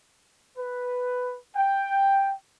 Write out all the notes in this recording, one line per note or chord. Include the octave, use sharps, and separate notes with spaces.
B4
G5